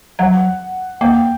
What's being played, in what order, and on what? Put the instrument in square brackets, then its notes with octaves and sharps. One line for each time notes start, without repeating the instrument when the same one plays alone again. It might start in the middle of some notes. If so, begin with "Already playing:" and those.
[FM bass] F#3 [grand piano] F#5
[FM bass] A#3 [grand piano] G5